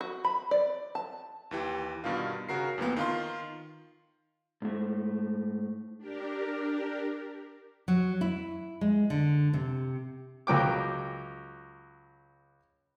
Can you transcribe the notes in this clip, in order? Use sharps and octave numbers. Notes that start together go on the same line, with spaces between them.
F#4
B5
D5
A5
D#2 E3 G4
G2 B2 D#3 F4
C#3 F#4 A#4 C7
F2 E3 A#3 B3
D#3 F4 C6
G#2 A3
D4 G4 A#4
F#3
E4
G#3
D3
C3
C#2 F#3 G5 D6